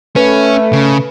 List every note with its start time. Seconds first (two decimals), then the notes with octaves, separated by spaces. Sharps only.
0.16 A3 C#4 B4
0.73 C#3